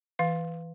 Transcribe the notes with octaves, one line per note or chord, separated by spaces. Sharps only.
E3 F5